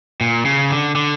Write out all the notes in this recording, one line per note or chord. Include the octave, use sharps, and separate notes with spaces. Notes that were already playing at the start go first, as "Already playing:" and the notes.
A#2
C#3
D3
D3